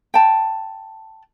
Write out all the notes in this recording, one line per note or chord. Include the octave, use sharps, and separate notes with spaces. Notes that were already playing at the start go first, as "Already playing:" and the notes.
G5 A5